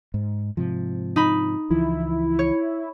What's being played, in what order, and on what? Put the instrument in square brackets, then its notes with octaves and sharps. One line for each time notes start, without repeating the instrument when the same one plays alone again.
[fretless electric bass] G#2
G#2 C3 F3
[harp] D#4 B5
[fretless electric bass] C#2 E3 F3 [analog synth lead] E4
[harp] C#5